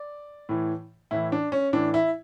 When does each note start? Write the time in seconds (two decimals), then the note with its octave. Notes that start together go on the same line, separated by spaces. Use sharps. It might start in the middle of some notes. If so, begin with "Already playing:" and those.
Already playing: D5
0.49 A2 E3
1.11 A2 E3 E4
1.32 D4
1.52 C#4
1.73 A2 E3 D4
1.94 E4